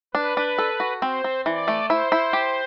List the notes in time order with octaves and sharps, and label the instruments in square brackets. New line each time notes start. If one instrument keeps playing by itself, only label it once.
[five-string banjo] D4 [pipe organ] B4
[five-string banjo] D4
A4
F#4
[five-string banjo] C4 [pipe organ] C5
[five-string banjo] C4
[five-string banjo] E3 [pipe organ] D5
[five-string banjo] A3
[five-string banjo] E4 [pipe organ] C5
[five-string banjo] E4
G4